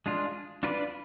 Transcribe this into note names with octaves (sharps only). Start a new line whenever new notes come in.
G#3 D4 F4
D4 F4 B4 D5